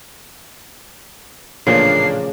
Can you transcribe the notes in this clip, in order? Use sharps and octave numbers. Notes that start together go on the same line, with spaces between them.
A1 A#2 C#3 F3 A#3 D4 C7